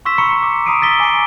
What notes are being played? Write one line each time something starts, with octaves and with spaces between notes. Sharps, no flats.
C6 C#6 E6 B6 E7
A#5 B5 C#6 C#7
D6
A#5 B5 D#6 C7 D7 D#7
E6 A6 B6 G7
G#5 D6 C7 D7